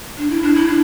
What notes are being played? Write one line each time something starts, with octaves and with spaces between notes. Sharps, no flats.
D4
E4
D4
E4
D4